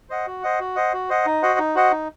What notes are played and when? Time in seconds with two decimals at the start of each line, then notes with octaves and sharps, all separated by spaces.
0.10 C5 D#5 F#5
0.27 F#4
0.43 C5 D#5 F#5
0.60 F#4
0.76 C5 D#5 F#5
0.93 F#4
1.10 C5 D#5 F#5
1.26 D#4
1.42 F#4 C5 D#5 F#5
1.59 D#4
1.75 F#4 C5 D#5 F#5
1.92 D#4